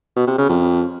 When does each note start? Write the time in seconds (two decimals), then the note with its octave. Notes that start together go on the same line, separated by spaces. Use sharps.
0.16 B2
0.27 C3
0.38 C#3
0.49 F2